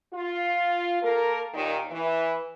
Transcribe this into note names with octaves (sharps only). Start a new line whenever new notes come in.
F4
A#3 A4 A#4
D#2 A#2 D#3
E3